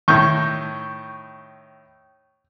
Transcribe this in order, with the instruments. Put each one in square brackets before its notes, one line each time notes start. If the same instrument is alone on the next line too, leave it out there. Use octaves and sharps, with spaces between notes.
[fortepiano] A2 D#3 [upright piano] C#6 G6